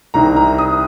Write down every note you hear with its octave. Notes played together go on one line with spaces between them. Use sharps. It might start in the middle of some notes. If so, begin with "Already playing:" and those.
C2 C3 D#3 A#5
A#5
D#6